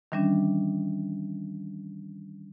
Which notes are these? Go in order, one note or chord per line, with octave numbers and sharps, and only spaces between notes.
D#3 E3 G3 C#4 D4